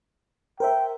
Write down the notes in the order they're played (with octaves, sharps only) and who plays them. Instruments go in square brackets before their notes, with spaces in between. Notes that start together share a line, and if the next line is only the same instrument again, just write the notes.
[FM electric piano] A#4 C5 E5 [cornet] G5